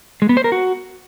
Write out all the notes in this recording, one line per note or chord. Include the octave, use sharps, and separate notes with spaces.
G#3
B3
C5
A#4
F#4